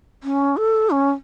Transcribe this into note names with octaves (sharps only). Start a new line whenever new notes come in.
C#4
A4
C#4